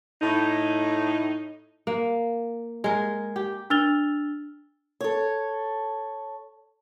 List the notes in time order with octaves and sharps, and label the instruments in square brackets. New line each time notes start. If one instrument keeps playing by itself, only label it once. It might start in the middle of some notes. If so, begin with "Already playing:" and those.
[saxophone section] A2 D#4
[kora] A#3
G#3 A#4
G4
[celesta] D4 E6 F6 A6 F7 G7
[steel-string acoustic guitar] A4 C#5